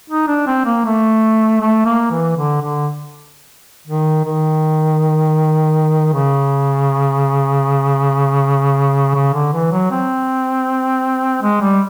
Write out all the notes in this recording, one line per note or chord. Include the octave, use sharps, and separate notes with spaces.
D#4
D4
C4
A#3
A3
A3
A#3
E3
D3
D3
D#3
D#3
C#3
C#3
D3
E3
F#3
C4
G#3
G3